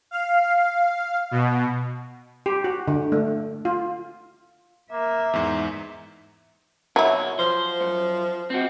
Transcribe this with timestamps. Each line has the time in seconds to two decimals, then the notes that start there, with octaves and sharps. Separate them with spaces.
0.11 F5
1.31 B2
2.46 G4
2.64 F#4
2.88 D3
3.12 A3
3.65 F4
4.92 A#3 E5
5.33 E2 G#2
6.96 B1 F#3 E4 C#5
7.39 F3 C5
7.81 F#2
8.50 C4 F#4